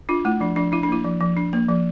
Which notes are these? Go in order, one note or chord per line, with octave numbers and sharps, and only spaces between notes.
D4 F4
A3 E4
F3 D4
F3 D4
D4 E4
D4
A#3 E4
F3
F3
D4
A#3
F3